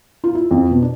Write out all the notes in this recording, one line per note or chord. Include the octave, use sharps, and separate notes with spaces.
F4
E4
F2
B2
D4